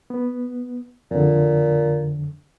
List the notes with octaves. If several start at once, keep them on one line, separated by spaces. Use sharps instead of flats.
B3
F2 A#2 D3